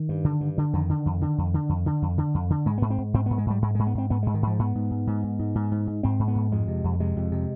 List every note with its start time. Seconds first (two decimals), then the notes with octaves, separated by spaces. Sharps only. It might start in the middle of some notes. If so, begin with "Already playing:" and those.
Already playing: D#3
0.09 G2
0.24 D3
0.41 G2
0.58 D3
0.73 F2 D#3
0.89 D3
1.06 F2
1.21 D3
1.38 F2
1.54 D3
1.69 F2
1.86 D3
2.02 F2
2.18 D3
2.34 F2
2.50 D3
2.65 G#2 G#3
2.78 G#2 B3
2.90 C4
2.98 G#2
3.14 G#2 C4
3.26 G#2 B3
3.38 G#3
3.46 G#2 G3
3.62 G#2 G#3
3.75 G#2 G#3
3.87 B3
3.95 G#2 C4
4.10 G#2 B3
4.23 G#2 G#3
4.34 D#3
4.42 G#2 F3
4.59 G#2 B3
4.75 G#2
4.91 G#2
5.07 G#2
5.24 G#2
5.39 G#2
5.55 G#2
5.72 G#2
5.87 G#2
6.03 G#2 C4
6.19 G#2
6.28 B3
6.35 G#2
6.52 F2 G#3
6.68 C3
6.84 F2
7.00 C3 G#3
7.16 F2
7.32 C3